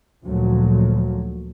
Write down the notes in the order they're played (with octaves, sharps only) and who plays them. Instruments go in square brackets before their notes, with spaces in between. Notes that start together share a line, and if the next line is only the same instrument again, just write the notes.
[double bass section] D2 A#2 F3 F#3